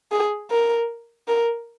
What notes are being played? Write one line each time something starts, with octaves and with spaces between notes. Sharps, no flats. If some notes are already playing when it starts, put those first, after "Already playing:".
G#4
A#4
A#4